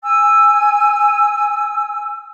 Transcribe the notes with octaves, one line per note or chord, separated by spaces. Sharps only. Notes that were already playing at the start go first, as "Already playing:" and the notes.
G#5 E6